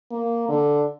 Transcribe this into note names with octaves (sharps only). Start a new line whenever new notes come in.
A#3
D3